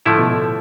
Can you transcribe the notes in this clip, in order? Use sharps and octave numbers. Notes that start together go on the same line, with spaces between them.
A2 D3 F3 A3 E4 A4
B2
A2